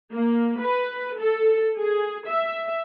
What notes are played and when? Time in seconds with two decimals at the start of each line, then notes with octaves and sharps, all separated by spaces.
0.13 A#3
0.61 B4
1.19 A4
1.79 G#4
2.28 E5